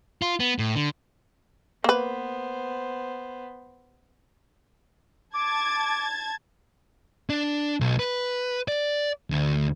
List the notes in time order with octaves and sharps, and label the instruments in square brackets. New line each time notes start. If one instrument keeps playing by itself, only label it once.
[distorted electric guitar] F4
B3
A2
D3
[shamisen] A#3 B4 [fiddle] B3 C5
[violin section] A5 G#6 A6 [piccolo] D6
[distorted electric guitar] D4
B1
B4
D5
D2